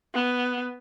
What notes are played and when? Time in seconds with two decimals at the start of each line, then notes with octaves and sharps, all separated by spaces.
0.14 B3